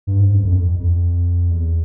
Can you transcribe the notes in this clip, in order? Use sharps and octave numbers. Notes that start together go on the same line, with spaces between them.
G2
G#2
F#2
F2
F#2
F2
F2
E2